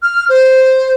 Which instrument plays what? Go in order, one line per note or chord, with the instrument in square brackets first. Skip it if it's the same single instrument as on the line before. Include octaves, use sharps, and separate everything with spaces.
[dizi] F6
C5